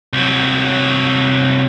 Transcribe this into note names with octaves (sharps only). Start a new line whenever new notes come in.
C2 F#3